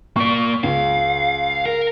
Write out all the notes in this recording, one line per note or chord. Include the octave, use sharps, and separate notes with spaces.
A#3 D5 C#6
C#2 F5
A#4